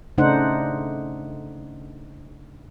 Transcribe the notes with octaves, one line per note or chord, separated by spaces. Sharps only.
C#3 A3 D4 D#4 C5 F#5